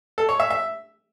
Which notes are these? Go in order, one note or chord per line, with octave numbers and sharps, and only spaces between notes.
A4
C#5
E5
E5